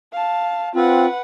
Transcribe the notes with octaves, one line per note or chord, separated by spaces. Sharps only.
F5 A5
C4 F4 B4 F#5